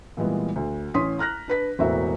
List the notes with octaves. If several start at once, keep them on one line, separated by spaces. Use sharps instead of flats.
A#2 E3 G3 G#3 B3
D2
A1 C#4 C6 D#6 B6
A#5 F6 F#6 A#6
D4 B4 B6
E1 A2 A#3 C4 F#4 E5